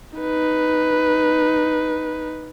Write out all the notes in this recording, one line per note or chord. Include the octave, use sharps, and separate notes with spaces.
D#4 B4